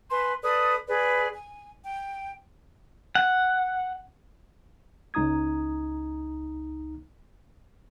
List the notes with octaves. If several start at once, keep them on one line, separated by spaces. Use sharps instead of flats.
B4 G#5 C6
A4 B4 D5 D#6
G#4 B4 D5
G#5
G5
F#5
C#2 D#4 A#5 D#6 G#6